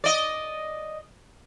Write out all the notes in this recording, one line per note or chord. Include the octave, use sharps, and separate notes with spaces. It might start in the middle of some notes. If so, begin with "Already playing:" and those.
D5 D#5